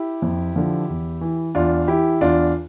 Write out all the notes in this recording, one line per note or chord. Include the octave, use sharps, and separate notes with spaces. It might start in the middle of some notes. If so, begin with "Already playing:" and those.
Already playing: E4 G4
F2
D3 F3
E2
E3
E2 D4 F4
E3 E4 G4
E2 D4 F4